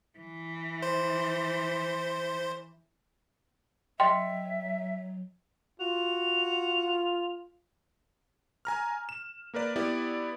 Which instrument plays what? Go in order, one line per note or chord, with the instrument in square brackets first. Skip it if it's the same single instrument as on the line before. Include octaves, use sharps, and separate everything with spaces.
[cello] E3
[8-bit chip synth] C5
[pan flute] F#3 [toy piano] D#5 G5 [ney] E5 [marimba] C6
[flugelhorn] F4 [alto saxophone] F#4 [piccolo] F7
[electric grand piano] G#5 A#5 F6
E7
A#3 A#4 B4 D5
B3 E4 G4 D5